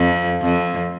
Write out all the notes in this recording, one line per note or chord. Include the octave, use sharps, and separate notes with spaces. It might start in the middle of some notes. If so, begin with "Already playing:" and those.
Already playing: F2
F2